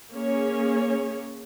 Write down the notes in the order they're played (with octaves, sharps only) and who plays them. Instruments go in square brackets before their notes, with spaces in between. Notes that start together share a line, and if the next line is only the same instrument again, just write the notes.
[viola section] A#3 C#4 G#4 C#5